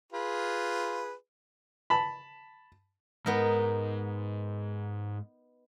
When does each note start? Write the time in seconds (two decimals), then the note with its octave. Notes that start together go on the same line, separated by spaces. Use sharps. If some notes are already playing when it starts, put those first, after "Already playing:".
0.12 F4 G#4 B4
1.90 A5 B5
3.26 G#2 B3 D#4 A#4